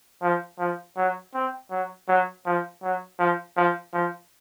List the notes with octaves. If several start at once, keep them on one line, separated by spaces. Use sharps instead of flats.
F3
F3
F#3
C4
F#3
F#3
F3
F#3
F3
F3
F3